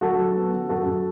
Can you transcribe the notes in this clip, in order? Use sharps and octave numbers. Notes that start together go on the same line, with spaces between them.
F#3 F#4 A4
F#3
B3
F#3
F#2 F#4 A4
F#2